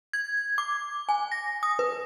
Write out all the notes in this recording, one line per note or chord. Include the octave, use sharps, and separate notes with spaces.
G#6
D6
G#5
A#6
D#6
B4